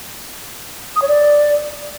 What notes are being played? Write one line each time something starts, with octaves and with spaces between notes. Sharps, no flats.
D#6
C#5
D5